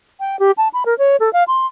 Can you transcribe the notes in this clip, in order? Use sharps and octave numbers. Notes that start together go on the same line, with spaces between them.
G5
G4
A5
B5
A#4
C#5
A4
F5
C6